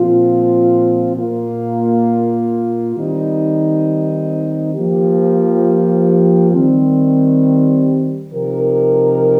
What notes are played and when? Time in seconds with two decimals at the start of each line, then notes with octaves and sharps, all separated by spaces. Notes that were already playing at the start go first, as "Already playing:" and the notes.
Already playing: A#2 F3 C4 F4
1.16 A#2 A#3 F4
2.95 D#3 G3 C4 D#4
4.73 F3 A#3 G4
6.52 D#3 G3 C4
8.31 C3 F3 D#4 G4 A#4